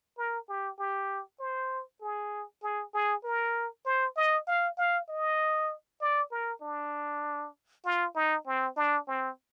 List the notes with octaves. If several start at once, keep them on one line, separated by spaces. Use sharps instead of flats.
A#4
G4
G4
C5
G#4
G#4
G#4
A#4
C5
D#5
F5
F5
D#5
D5
A#4
D4
F4
D#4
C4
D4
C4